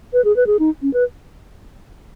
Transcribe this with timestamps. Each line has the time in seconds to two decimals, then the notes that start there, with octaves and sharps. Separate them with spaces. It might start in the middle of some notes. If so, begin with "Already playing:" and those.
0.13 B4
0.24 G#4
0.36 B4
0.47 G#4
0.59 D#4
0.82 C#4
0.93 B4